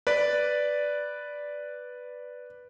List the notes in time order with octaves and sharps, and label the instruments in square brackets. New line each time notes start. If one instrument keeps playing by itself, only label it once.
[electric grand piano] B4 D5